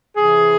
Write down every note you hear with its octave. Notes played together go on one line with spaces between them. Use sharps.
C3 E3 G#4